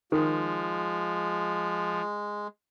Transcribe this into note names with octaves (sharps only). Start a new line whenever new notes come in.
D#3 F3 G#3